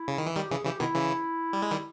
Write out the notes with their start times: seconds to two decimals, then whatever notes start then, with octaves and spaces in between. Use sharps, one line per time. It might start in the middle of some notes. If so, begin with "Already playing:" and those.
Already playing: E4
0.08 C#3
0.18 D#3
0.26 E3
0.36 D#3 G3 G4
0.50 C#3 E3 G#4
0.65 C#3 E3 G4
0.80 B2 D#3 E4
0.95 C#3 E3
1.53 G3
1.62 G#3
1.71 D#3 G3